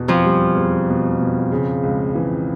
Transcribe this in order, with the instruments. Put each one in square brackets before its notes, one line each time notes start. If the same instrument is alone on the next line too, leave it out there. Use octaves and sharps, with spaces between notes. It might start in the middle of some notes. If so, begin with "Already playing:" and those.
Already playing: [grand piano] E2 B2
[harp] F2 F3
[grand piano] G3
E2
B2
B2
C#3
C#2
E3